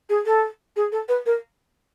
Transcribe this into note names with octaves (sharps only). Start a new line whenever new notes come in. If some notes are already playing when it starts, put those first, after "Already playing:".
G#4
A4
G#4
A4
B4
A#4